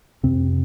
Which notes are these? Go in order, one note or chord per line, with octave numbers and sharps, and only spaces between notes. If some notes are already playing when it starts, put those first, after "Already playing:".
F2 C3 C4